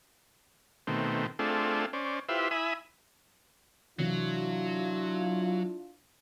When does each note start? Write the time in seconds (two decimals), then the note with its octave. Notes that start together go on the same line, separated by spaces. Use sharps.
0.87 B2 D#3 A3 C4
1.39 A3 C4 D4 F4 G#4 A4
1.93 C#4 C5 D5
2.29 E4 F4 G4 B4 C5 E5
2.51 E4 E5 G#5 B5 D#6
3.99 C3 E3 F#3 C4 D4 E4 F4